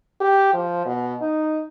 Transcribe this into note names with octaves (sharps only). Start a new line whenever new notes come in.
G4
F3
B2
D#4